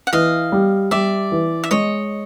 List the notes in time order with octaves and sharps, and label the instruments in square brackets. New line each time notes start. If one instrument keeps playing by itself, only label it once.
[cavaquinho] F#5
[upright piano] E3 [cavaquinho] D#5 F5
[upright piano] G3
[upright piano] G3 [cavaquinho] D5 E5
[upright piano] E3
[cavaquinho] E5
[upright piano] G#3 [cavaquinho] C#5 D#5